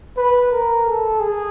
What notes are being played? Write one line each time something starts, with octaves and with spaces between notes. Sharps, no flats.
B4
A#4
A4
G#4